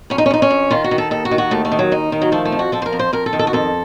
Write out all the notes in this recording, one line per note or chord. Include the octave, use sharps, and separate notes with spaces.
F2 C#4
D#4
C#4
F2 D#4
C#4
F2
D#3 F4
F#4
D#3
A4
D#2 A4
F#4
D#3
F#4
D#2 A3
A3
D#3
F#3
D#2 D#4
D#3
F#3
F3 A3
A3
F2
F#4
F3 A4
C5
A#4
F2
C5
F2 A#4
A4
D#3
A4
F#4
F2 A4